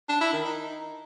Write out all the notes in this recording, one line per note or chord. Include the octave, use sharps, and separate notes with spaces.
D4
E4
D#3
D#4